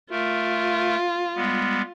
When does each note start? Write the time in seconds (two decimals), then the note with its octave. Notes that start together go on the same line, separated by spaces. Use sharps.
0.11 A3 F4 A#4
1.36 G3 G#3 B3